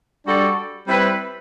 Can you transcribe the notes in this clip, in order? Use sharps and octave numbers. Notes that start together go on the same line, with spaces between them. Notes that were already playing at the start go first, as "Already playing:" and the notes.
G3 D4 F#4 A4 D5
G3 C4 E4 B4